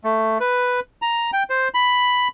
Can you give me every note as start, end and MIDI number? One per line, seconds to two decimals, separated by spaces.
0.04 0.38 57
0.40 0.80 71
1.02 1.31 82
1.33 1.43 79
1.50 1.68 72
1.74 2.28 83